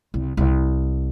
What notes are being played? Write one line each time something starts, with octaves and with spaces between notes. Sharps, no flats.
C2
C2